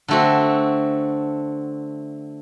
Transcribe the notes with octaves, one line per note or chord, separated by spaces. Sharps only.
D3 A3 C4 F#4